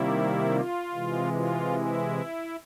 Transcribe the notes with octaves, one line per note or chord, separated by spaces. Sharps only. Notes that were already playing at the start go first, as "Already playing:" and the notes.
Already playing: C3 D#3 G3 A#3 E4
F4
C3 E3 G#3
F4
E4